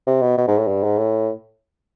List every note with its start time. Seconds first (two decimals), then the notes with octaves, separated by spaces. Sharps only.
0.07 C3
0.22 B2
0.38 B2
0.48 G#2
0.58 A2
0.68 G2
0.83 G#2
0.98 A2